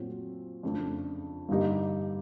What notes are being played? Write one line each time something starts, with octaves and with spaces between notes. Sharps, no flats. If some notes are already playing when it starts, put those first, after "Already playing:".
Already playing: A#2 F#3 A3 C4
F2 C#3 F3 A3 D4
G2 D3 G3 A#3 D#4